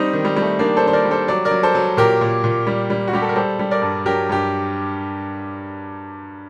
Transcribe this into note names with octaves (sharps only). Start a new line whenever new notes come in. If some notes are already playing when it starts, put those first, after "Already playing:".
Already playing: G3 C4 D#4
D#3
G3
G3
A3
D#3 A#3 D4
A4 C5
D#3
C5
A#4 D5
G3
A4 C5
F#3 D5
A#4 D5
F#3
A4 C5
F#3
A#2 G4 A#4
A#2
A#2
G3
G3
F#4
G3 G4
A4
A#4
G3 A4 C5
G3
A#4 D5
G2
F#3 G4 A#4
G2 G4